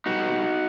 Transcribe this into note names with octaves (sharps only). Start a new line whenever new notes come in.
B2 G3 D#4 F#4